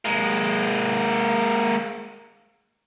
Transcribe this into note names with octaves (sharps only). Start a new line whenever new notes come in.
G#3 A#3